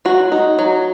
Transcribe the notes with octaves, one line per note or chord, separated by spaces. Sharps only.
F#3 F#4
D#4
F#3